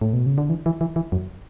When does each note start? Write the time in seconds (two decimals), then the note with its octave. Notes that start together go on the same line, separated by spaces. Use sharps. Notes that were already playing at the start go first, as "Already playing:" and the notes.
0.01 A2
0.13 B2
0.26 C#3
0.38 D3
0.49 E3
0.66 E3
0.81 E3
0.96 E3
1.12 F#2